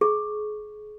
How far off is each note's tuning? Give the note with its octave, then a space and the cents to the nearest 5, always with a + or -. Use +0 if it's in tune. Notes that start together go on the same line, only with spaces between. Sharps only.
G#4 +30 C#6 +0